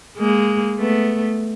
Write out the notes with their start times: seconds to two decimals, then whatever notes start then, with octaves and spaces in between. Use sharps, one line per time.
0.18 G#3 A#3
0.79 A3 B3